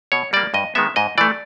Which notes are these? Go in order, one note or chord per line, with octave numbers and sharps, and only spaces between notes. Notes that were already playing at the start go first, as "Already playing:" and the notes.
B2 C#5
G3 A#3 D5
G2 D#5
D#3 G#3 B3 E5
G#2 D#5
E3 A3 D5